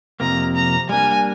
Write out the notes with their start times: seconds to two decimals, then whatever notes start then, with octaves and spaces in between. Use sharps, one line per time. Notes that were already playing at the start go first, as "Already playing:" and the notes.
0.20 F2 C3 F3 A#3 A#5
0.55 A#5
0.89 G3 A#3 D4 G#5